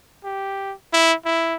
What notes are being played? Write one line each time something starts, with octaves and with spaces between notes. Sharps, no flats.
G4
E4
E4